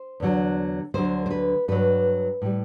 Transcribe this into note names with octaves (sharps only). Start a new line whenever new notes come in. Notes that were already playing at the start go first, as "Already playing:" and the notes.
Already playing: C5
E2 D3 F#3
D2 D3 F#3 C5
C5
B4
G2 F#3 B4
A2 G3